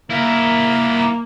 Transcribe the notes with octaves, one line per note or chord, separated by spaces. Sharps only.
A#3 E4 A#4